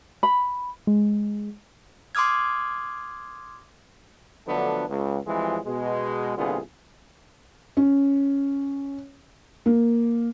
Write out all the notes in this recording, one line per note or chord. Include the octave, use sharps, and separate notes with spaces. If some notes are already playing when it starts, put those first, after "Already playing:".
B5
G#3
C6 D6 D#6 F6 G#6
D3 F3 F#3 A3 B3 D4
C#2
F2 E3 F3 G3 G#3
B2 G#3
C2 A#2 D3 B3 F4 G#4
C#4
A#3